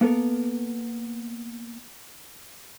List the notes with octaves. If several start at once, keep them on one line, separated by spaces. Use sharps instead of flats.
A#3 B3 A4 A#4